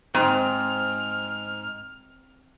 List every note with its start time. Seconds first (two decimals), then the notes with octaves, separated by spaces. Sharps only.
0.15 G#2 C4 F6